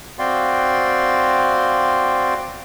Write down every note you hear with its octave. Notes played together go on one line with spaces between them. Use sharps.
C4 F#4 D5 F5 G5 C6